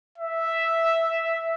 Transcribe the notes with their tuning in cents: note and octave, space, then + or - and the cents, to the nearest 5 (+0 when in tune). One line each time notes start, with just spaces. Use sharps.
E5 +0